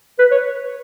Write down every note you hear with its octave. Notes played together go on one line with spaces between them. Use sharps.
B4
C#5